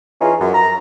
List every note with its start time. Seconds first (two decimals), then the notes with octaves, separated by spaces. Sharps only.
0.21 E3 C#4 D#4 F4 G#4
0.40 F#2
0.54 A#5